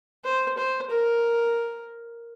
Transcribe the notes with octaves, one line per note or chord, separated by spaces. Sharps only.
C5
C5
A#4